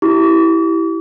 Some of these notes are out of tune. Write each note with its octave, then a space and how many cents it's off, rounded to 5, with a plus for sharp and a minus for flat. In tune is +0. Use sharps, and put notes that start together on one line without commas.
E4 +0 G4 -15 D6 -45